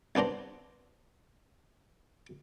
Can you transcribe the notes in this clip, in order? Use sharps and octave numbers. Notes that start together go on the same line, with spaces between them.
C2 B3 D4 C5 A#5